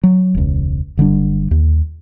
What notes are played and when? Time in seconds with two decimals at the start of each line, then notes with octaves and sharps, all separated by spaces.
0.03 F#3
0.35 E1 C#2
0.97 F#1 D3 G3 D4
1.51 D#2